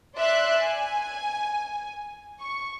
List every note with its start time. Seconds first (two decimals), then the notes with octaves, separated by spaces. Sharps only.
0.14 D5 E5 C6 F#6
0.57 G#5
2.41 C#6